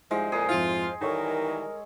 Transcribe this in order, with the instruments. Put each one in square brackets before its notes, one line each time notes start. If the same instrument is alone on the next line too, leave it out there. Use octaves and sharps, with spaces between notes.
[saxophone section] G#2 F3 G3 [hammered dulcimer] G#3 [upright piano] E4 [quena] C5
[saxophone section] F2 A#2 [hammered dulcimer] G#4
[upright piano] F2 G#2 E4 [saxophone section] F4
[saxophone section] D#3 E3 G3 [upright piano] A4 C#5 C#6 [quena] A#4